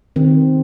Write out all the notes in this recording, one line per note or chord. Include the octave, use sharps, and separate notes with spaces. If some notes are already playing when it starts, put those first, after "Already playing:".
D#3 C4